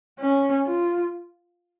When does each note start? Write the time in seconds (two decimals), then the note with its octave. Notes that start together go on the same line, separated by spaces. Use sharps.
0.19 C#4
0.67 F4